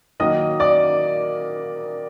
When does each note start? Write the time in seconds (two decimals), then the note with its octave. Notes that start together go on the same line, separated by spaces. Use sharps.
0.20 D#3 F#3 A#3 D#5 D#6
0.60 D5 D6